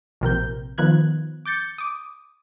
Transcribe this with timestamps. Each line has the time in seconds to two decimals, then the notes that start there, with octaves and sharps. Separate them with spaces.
0.21 A#1 C3 A#4 G6
0.78 D#3 F3 B3 F#6 G#6
1.45 D6 G6 A6 C#7
1.78 D6 D#6